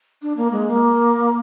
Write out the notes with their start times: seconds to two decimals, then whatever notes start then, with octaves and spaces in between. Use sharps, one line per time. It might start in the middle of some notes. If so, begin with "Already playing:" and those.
0.22 D4
0.37 A#3
0.52 G#3
0.68 A#3